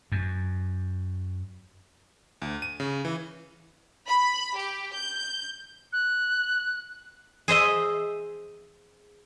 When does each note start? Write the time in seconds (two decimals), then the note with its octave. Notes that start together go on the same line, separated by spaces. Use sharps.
0.12 F#2
2.42 D2
2.62 D#7
2.80 C#3
3.05 E3
4.06 B5
4.56 G4
4.95 G6
5.93 F#6
7.48 G#4 C5 D#5 E5